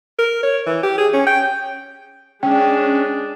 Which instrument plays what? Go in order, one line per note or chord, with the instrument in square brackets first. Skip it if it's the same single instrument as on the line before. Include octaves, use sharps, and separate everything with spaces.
[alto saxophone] A#4
C#5
E3
G4
G#4
C#4
G5
[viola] G#3 D4 [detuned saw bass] C#4 [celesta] G5